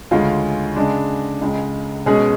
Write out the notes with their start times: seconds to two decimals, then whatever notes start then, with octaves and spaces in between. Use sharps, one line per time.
0.11 D2 C#3 G#3 C#4 F4
0.76 C#3 G#3 D4
1.41 C#2 C#3 G#3
2.06 B2 G#3 C#4 G#4